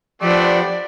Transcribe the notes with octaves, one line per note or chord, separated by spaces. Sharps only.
F3 A3 B3 D4 G4 D5